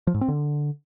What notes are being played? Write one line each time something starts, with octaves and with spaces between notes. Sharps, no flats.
F3
G#2
C4
D3